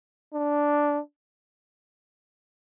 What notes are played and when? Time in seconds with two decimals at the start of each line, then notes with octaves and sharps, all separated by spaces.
0.34 D4